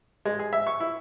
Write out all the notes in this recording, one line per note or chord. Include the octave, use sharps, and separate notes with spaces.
G#3
G#4
E5
C#6
E4